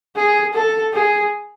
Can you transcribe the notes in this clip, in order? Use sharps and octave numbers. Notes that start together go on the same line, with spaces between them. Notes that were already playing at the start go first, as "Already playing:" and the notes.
G#4
A4
G#4